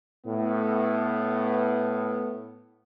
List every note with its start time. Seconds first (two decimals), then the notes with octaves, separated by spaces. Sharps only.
0.27 A2 B3